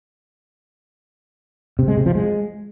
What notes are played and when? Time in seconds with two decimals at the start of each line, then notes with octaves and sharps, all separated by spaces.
1.79 C3
1.88 G#3
1.97 C3
2.06 F3
2.15 G#3